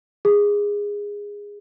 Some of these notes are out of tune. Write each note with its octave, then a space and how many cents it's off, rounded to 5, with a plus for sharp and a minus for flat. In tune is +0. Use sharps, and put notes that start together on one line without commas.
G#4 -15